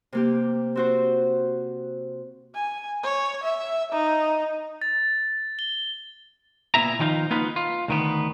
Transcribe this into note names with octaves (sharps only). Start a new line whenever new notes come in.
C3 A#3 G4
C4 F#4 C5
G#5
C#5
E5
D#4
A6
G7
A#2 A3 B3 E4 E5 A#5
D#3 F3 G3 D#4 F4
A#3 B3 D#4 F4 B4
F4
D2 D#3 B3